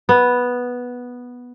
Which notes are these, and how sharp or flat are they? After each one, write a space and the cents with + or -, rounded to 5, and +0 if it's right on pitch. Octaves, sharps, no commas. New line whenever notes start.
B3 -5